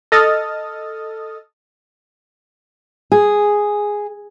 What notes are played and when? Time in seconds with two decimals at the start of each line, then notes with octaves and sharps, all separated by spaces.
0.12 A4 D#5 D#6 F6 A6
3.12 G#4